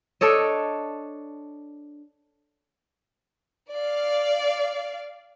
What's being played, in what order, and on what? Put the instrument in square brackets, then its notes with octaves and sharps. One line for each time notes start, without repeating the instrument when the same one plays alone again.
[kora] D4 A4 C#5 D#5
[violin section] D5 F5